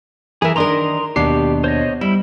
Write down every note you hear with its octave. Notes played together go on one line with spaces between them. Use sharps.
E3 G#4 A#4 E5
D#3 D4 A#4 A#5 C6 D#6
D#2 B2 D4 G4 C7
C5 C#5 D#5
G3 E4